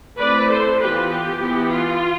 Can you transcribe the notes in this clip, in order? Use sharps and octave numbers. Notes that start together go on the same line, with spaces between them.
A3 C4 E4 B4 D5
A4 C5
E3 B3 F4 G4 B4
G4
E3 B3 E4
F4